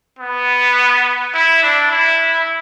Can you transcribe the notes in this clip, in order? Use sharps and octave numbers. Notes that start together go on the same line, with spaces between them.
B3
E4
D4
E4